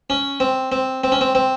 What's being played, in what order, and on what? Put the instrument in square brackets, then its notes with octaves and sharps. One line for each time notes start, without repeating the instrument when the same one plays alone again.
[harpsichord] C#4
C4
C4
C4
C#4
C4
C4